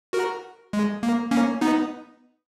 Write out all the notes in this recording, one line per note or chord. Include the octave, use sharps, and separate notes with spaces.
F#4 A#4
G#3
A#3
A#3 C#4
B3 D#4